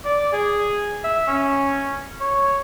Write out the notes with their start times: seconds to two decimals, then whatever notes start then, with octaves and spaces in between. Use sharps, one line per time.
0.05 D5
0.33 G#4
1.04 E5
1.27 C#4
2.20 C#5